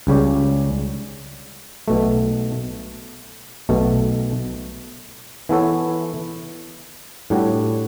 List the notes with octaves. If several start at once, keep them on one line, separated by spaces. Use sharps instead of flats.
C#2 C#3 G3 C#4 G4
B1 B2 A3
B1 B2 A3
E3 B3 E4 A4 C#5
A2 G3 D4 F#4 C#5